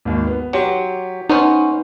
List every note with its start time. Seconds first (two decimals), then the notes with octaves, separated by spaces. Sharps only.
0.05 G#1 D#2
0.27 B3
0.53 F#3 G4 C#5 C6
1.30 B3 C#4 D#4 C5